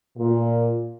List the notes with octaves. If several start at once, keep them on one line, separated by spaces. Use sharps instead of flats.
A#2